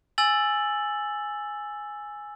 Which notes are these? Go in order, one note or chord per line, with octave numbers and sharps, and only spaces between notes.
G#5 E6 A6 F#7